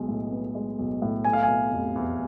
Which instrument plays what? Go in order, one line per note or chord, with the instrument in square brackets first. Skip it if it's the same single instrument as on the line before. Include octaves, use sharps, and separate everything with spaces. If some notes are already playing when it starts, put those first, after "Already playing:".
Already playing: [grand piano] B1 G#3 B3
A2
B3
G#3
B1
A2
A3 G#5
F5
G#5
B2
F1
E2